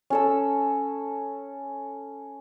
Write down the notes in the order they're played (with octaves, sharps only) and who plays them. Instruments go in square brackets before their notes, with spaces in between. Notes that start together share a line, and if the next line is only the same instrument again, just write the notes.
[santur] C#4 A4 E6